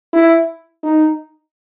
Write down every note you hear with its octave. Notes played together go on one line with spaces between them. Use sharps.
E4
D#4